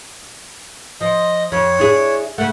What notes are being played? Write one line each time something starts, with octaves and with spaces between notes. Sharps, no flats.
F3 D#5
F2 C#5
D4 E4 G#4
C#3 A3 F#5